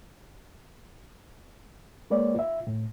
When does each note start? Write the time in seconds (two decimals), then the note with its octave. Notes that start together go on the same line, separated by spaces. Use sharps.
2.10 G#3 A#3 B4 C#5 D5
2.35 F4 E5
2.67 A2